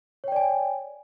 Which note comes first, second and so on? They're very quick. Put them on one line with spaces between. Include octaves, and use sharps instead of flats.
C#5 G5 D5 G#5